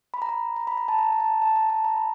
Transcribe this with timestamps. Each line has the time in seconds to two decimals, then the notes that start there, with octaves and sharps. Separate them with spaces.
0.14 B5
0.22 A#5
0.29 B5
0.56 A#5
0.67 B5
0.77 A#5
0.88 A5
0.98 A#5
1.12 A#5
1.20 A5
1.42 A5
1.56 A#5
1.70 A5
1.85 A#5
1.96 B5